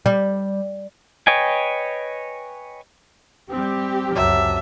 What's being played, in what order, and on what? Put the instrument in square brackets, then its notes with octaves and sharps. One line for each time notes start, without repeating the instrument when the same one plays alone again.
[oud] G3
[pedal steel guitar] B4 C#5 D#5 G5 G#5
[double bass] G3 C4 [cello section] G4
[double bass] C#2 F#2 [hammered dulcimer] C3 F#3 A5 [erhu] E5